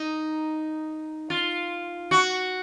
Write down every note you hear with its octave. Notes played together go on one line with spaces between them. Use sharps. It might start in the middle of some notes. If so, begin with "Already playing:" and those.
Already playing: D#4
F4
F#4